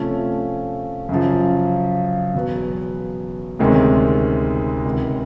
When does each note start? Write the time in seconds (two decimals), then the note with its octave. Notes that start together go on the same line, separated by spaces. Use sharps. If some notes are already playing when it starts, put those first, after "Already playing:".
Already playing: C3 F3 A3 C#4
1.09 F#2 C#3 F3
2.34 E2 B2 F#3 B3
3.59 D2 C3 D#3 G#3 C#4
4.84 C#2 C3 D#3